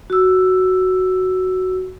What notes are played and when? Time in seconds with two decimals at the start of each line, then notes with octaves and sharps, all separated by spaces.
0.10 F#4 E6